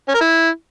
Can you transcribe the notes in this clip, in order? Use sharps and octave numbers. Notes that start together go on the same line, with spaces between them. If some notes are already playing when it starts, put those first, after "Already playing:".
C#4
A#4
E4